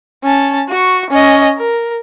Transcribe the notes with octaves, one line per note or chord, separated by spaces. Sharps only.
C#4 A5
F#4 C#6
C#4 D#5
A#4